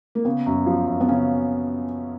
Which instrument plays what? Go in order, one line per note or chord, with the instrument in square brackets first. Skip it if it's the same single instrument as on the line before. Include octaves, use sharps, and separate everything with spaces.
[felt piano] A#3
[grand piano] C#3 [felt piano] B3
[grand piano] F#2
F3
F#2
[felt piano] B3
[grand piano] C#3 [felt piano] C#4